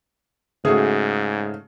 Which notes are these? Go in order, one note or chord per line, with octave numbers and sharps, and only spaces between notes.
G#2 C#3 A3 F#4 G#4